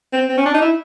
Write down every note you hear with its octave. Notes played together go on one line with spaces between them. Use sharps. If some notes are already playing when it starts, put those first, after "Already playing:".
C4
C4
C#4
D4
D#4
E4